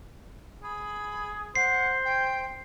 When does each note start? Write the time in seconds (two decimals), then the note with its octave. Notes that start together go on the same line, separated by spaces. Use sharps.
0.63 G#4 B5
1.55 C5 F#5 C7
2.05 G5